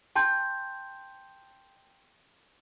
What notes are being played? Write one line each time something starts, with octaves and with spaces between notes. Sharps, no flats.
G5 A5 C6 G6